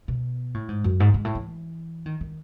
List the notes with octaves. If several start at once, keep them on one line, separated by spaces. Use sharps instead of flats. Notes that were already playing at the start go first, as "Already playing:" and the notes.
B2
A2
G#2
F#2
G#2
G#2
A2
E3
D#3
D#3